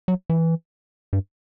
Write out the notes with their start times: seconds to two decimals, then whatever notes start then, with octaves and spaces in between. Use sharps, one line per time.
0.08 F#3
0.30 E3
1.13 G2